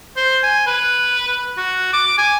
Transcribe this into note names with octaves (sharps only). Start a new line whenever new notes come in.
C5
G#5
B4
F#4
D6
G#5